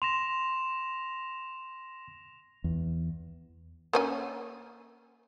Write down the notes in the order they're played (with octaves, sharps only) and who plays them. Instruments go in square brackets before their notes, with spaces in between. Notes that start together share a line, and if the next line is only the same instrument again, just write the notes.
[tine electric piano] C6 [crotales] A#6 E7 F7
[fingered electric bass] E2
[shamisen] A#3 C#4 G#5